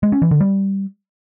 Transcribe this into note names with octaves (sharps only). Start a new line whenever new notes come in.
G#3
C#4
E3
D3
G3